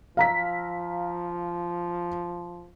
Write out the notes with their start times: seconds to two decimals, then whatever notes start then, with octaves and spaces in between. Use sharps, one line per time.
0.17 F3 F5 A#5 B6